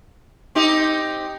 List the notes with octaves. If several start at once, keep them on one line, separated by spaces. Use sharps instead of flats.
C4 D#4 G4